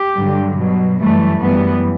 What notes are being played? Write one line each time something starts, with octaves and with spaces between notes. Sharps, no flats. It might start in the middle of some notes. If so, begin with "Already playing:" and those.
Already playing: G4
G2 D3 F#3
B2 F#3
F#2 E3 G3 A3
F#2 E3 G3 B3